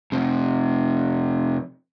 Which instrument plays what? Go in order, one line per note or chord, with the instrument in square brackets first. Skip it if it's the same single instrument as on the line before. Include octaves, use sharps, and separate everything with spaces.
[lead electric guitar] F2 C3